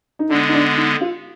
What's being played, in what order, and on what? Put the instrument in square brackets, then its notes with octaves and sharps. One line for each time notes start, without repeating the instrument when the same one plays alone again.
[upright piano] D#4
[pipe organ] D3 G#3 B3 [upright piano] D4
[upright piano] D#4
D4
D#4
F4